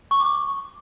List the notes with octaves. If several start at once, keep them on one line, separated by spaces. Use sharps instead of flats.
C#6
D6